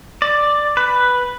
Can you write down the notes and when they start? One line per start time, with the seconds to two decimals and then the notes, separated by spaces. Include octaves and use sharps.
0.22 D5
0.77 B4